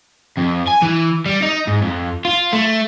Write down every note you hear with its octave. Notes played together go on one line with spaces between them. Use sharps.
F2
G#5
E3
G3
D#4
G#2
F2
F4
A3